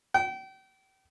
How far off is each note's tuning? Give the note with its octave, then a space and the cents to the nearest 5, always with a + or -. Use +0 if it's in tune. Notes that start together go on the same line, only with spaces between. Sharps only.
G5 -35